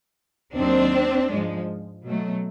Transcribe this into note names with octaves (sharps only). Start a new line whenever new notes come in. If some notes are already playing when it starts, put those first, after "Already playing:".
D#2 D#3 F#3 C4 D4
G#2 F3 G#3
B2 F#3 A3